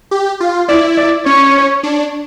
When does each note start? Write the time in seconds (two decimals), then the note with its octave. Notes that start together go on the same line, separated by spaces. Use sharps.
0.11 G4
0.40 F4
0.69 E4 D5
0.97 D5
1.26 C#4 C#5
1.83 D4